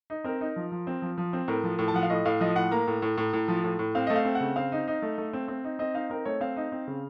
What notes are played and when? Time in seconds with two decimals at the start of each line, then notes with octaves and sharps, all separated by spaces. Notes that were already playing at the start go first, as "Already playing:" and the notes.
0.10 D#4
0.24 C4 A#4
0.41 D#4
0.56 F3
0.72 F3
0.87 C4
1.02 F3
1.18 F3
1.33 C4
1.48 A2 A#4
1.63 F3
1.79 A2
1.88 A5
1.94 F3 F#5
2.03 F5
2.10 A2 D#5
2.25 A2 F5
2.40 F3 D#5
2.55 A2 F#5
2.71 A#3 A#5
2.87 A2
3.02 A2
3.17 A2
3.33 A2
3.48 F3
3.64 A2
3.79 A2
3.95 C4 F5
4.07 A3 D#5
4.16 F5
4.25 C4
4.35 F#5
4.40 C#3
4.56 C4 F5
4.72 D#4
4.88 D#4
5.02 A3
5.18 A3
5.33 C4
5.48 C4
5.64 D#4
5.79 C4 D#5
5.94 D#4 F5
6.10 C4 A#4
6.25 A3 C#5
6.41 C4 F5
6.57 D#4
6.72 C4
6.87 C#3